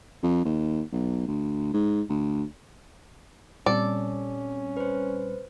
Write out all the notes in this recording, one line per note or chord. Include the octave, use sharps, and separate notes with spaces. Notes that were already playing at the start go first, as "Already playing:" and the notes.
F2
D#2
B1
D2
G#2
D2
A#2 G3 C4 C#4 A4 D5
B4 C5